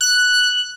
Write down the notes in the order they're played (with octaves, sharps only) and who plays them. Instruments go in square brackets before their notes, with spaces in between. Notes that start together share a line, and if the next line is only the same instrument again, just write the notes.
[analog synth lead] F#6